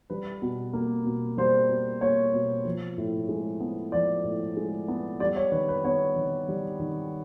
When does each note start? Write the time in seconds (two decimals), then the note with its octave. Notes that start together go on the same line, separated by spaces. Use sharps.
0.10 G3 B4
0.42 B2
0.73 A#3
1.05 B2
1.37 G3 C5
1.69 B2
2.01 A#3 C#5
2.33 B2
2.65 F3
2.98 A2
3.29 G#3
3.60 B3
3.92 F3 D5
4.24 A2
4.57 G#3
4.88 B3
5.20 G3 D5
5.36 C#5
5.52 D#3 B4
5.69 B4
5.84 B3 C#5
6.16 D#3
6.48 G3
6.80 D#3